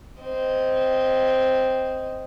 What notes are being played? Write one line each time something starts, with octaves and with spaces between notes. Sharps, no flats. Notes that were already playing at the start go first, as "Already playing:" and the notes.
C4 D#5